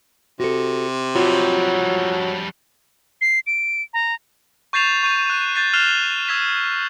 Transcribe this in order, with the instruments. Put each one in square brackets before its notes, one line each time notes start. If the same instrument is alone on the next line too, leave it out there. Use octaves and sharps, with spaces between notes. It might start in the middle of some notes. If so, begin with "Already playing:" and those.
[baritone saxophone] C3 [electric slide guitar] F#4 A4
[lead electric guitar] F2 G3 [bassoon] F#3 [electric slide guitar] F4 F#4
[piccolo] C7
D7
A#5
[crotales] C#6 G6 A6 C7 E7 F7
C#6 G6 D#7
F#6
G6 A6 C7
F6 F#6 C7 E7 F7 G7
E6 G#6 B6